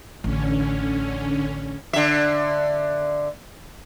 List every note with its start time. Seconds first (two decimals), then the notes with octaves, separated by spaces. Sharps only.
0.24 A1 D3 C#4
1.93 D3 E5